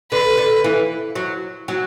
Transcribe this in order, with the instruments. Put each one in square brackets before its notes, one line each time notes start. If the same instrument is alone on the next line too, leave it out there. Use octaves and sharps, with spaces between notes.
[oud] D3 [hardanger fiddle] B4
[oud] D3
E3
F#3
F#3